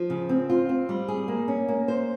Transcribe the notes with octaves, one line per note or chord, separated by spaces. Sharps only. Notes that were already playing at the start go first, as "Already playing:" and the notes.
Already playing: F3
C#3
C4
F4
C4
G3
G#4
A#3
C#4
A#3
C5